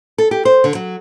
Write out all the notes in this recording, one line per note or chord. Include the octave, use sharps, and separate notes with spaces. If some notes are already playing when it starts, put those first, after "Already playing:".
A4
G4
C5
D3
F#3